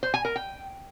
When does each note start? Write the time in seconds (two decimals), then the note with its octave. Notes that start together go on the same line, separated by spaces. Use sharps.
0.03 C5
0.14 G#5
0.25 A#4
0.36 G5